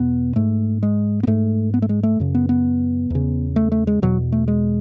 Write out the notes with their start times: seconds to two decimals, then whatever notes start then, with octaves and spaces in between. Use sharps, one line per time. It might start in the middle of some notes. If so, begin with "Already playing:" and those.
Already playing: E2 B2 B3
0.36 G#2 A3
0.83 G#3
1.23 B3
1.27 G#2 A3
1.74 B3
1.82 A3
1.89 G#3
2.03 A3
2.20 F#2 C#3
2.35 B3
2.49 B3
3.10 E2 C#3
3.56 A3
3.72 A3
3.87 G#3
4.02 E2 B2 F#3
4.32 A3
4.48 G#3